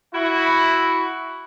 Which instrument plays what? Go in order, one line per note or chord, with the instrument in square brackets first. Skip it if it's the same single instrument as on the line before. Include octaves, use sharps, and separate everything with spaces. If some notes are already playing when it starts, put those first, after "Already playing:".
[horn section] E4 F#4